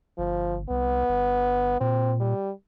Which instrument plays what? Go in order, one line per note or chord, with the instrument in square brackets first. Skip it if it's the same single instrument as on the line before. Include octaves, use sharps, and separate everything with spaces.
[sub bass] G1 [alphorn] F3
[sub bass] C2 [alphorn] B3
[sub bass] G1
[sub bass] A#2 [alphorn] C4
[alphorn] G3